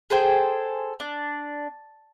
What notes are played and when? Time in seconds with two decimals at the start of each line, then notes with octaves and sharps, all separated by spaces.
0.10 G#4 A4 C5 G5
1.00 D4